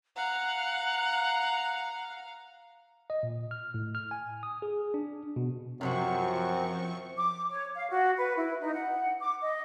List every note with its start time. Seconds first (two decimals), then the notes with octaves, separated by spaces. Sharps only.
0.16 F5 F#5 A#5
3.10 D#5
3.23 A#2
3.51 F6
3.74 A2
3.95 F6
4.11 G#5
4.43 D#6
4.62 G#4
4.94 D4
5.36 B2
5.81 F#2 C3 F3 F#3 C4 F#4 C#6
7.17 D6
7.51 C#5
7.75 F5
7.89 F#4
8.17 B4
8.36 E4
8.61 D#4
8.73 F#5
9.20 D6
9.42 D#5